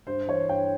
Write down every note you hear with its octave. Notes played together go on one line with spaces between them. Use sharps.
G2 C5
E3 C#5
G2 G5